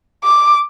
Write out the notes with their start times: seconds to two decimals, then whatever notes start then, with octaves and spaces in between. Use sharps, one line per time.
0.24 D6